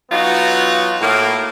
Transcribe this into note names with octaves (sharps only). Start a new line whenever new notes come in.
E3 F#3 B3 D#4 F4 F#4
A2 A#3